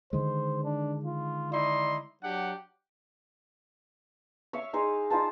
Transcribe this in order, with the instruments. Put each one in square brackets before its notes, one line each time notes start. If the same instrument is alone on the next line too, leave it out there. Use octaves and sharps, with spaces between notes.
[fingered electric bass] D3 D#3 G#3 [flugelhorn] C5
[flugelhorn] D4
F4
[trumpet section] D#4 E4 C6 [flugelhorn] D5
[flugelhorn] F#3 [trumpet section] D4 G4 F#5
[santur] C#5 E5 F5 C#6
D#4 G#4 C5
D#4 F4 C5 A5